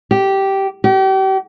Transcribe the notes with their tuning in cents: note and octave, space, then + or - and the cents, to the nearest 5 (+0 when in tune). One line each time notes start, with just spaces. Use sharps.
G4 -10
G4 -35